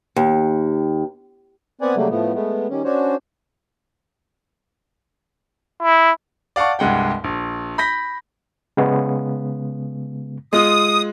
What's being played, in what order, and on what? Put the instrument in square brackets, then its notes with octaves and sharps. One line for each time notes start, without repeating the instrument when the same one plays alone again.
[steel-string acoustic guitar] D#2
[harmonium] B3 C4 B4 D5 F#5 G#5
C#3 F#3 G3 A3 A#3
A2 F3 A3 B3
G#3 A3 B3
D#3 G3 C#4
C#4 D4 F#4 C5 C#5
[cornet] E4
[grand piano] D5 F5 F#5 A5 C#6
C2 G2 G#3 F#5 G5
A#1
B5 G6 A#6 B6
[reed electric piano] C#3 G#3 B3
[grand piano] G#3 F4 [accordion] D#6